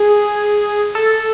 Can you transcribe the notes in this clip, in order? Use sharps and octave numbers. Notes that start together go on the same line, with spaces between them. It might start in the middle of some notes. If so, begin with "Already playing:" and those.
Already playing: G#4
A4